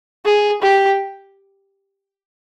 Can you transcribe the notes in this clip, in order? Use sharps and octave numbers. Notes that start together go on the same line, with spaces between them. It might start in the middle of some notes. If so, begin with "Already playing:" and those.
G#4
G4